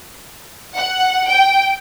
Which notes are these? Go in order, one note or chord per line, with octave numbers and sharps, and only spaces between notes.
F#5
G5